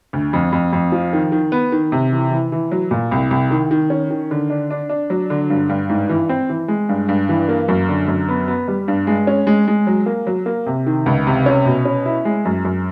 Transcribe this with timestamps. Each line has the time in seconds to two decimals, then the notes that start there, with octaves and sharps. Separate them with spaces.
0.13 D2
0.33 F2
0.52 F2
0.73 F2
0.92 F3
1.13 D#3
1.32 D#3
1.52 B3
1.72 D#3
1.92 C3
2.12 E3
2.31 E3
2.52 E3
2.72 F#3
2.91 A#2
3.11 C2
3.31 C2
3.51 D#3
3.71 D#3
3.90 C#4
4.10 D#3
4.31 D3
4.50 D4
4.71 D4
4.89 D4
5.10 F#3
5.30 D3
5.50 G2
5.69 G2
5.89 G#2
6.09 E3
6.29 C4
6.49 E3
6.68 G#3
6.89 G2
7.09 G2
7.29 E3
7.49 A#3
7.68 F#2
7.89 D3
8.08 F#2
8.28 B3
8.48 B3
8.68 G3
8.88 G2
9.07 G#3
9.27 C#4
9.47 G#3
9.68 G#3
9.87 F#3
10.06 A#3
10.27 F#3
10.46 A#3
10.66 C3
10.86 D#3
11.06 C#2
11.27 C3
11.46 C#4
11.65 B2
11.85 C#4
12.06 E4
12.25 G#3
12.45 F#2
12.65 F#2